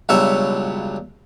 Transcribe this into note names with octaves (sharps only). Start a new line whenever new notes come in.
C#2 G2 B2 F#3 C#5 E5